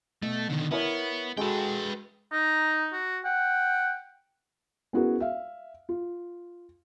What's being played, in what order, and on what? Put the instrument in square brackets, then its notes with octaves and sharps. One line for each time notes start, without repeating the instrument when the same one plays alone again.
[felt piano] B2 [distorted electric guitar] A3
[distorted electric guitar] D3 D#3
[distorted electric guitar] B3 [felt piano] E4 A#4 C#5
[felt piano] G#3 F#4 A4 [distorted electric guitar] B4 G5
[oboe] D#4 [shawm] A#5
[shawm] F#4
[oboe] F#5 [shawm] G5
[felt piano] B3 C#4 E4 F#4 G#4 A#4
E5 F5
F4